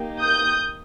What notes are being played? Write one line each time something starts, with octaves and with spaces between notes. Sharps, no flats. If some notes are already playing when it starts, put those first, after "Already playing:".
Already playing: A#3 D#4 G4
D#6 G6